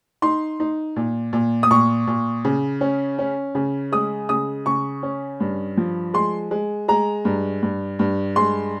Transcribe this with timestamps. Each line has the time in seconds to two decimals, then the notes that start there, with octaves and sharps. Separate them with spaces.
0.22 D#4 C6
0.60 D#4
0.96 A#2
1.33 A#2
1.63 D#6
1.71 A#2 C#6
2.07 A#2
2.45 C#3
2.81 C#4
3.19 C#4
3.55 C#3
3.92 G#3 D#6
4.29 C#3 D#6
4.66 C#3 C#6
5.03 C#4
5.40 G2
5.77 F3
6.14 G#3 C6
6.51 G#3
6.88 G#3 A#5
7.25 G2
7.62 G2
7.99 G2
8.36 G#3 C6